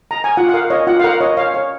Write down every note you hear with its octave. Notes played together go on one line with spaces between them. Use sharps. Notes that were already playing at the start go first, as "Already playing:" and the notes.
A#5
G#5
F4 F#5
F#5
A#4 F5
C#5 D#5
F4 F#5
F5
A#4 F#5
C#5 D#5
C#5 F5
C#5